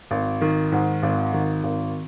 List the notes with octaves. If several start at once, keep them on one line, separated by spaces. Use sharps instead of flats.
G#1
D#3
G#2
G#1
D#3
G#1